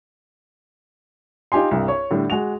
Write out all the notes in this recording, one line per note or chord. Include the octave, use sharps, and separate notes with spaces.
D#4 F4 G4 G#5 C6
C2 G2
C#5
A2 D3 G3
G#3 F#4 F7